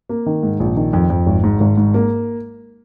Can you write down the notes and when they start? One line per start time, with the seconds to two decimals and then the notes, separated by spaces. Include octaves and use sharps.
0.09 A#3
0.26 D#3
0.43 G#2
0.60 A#1
0.76 D#3
0.93 F2
1.10 F2
1.26 G#1
1.44 G#2
1.60 G#1
1.77 G#2
1.94 A#3